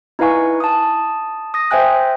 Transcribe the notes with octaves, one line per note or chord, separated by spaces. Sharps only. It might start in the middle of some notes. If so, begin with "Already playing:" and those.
D#4 E4 B4 F5 G#5 C#6
A5 D#6
D#6 A#6
C5 E5 G5 G#5 F#6